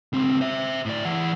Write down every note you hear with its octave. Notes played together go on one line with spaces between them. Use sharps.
C#2 C4
C5 E5
A2 D5
E3 F#5